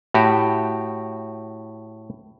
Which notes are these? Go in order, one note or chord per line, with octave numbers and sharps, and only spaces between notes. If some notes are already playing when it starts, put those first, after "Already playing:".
A2 F#4 G4